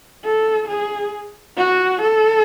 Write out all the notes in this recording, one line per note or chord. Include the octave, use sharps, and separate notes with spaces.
A4
G#4
F#4
A4